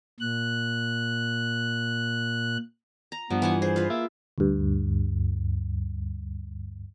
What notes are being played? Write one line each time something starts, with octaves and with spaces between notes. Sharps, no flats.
A#2 F#6
A#5
G2 F3 G3 B3
E3 F#5 G#5
G#4 C5
F4 B4
A#3 E5
D2 G2